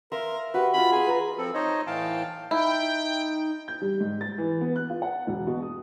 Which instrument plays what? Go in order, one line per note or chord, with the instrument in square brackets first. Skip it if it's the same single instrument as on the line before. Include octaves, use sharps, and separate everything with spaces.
[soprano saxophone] A#4 [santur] C5 E5 F5
[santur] F#4 G4 [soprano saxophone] B4
[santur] F4 D#5 G#5 [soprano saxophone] B5
[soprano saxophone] G#4 [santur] G#5 A#5
[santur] B4 A#5
[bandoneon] F3 C4 A4
D#4 C5 C#5 D#5
A2 E3 F5 G5 A5
[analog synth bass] D#4 [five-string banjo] E4 [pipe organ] G5
[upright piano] G6
G3
G#2
A6
E3
B3
F#6
F4
F#5
E1
B2
D#6